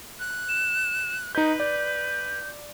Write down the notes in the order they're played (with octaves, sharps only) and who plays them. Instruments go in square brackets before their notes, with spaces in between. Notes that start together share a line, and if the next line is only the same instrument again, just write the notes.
[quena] F#6
[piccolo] E7
[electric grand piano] D#4 G6 [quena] B4 [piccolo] D#5
[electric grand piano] D5 [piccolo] G6